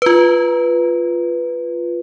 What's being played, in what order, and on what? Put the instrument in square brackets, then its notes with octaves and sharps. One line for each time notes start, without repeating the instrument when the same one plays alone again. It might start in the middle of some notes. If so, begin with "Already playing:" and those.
[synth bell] F4 B4